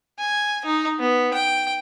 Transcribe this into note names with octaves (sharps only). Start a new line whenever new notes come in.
G#5
D#4
B3
G5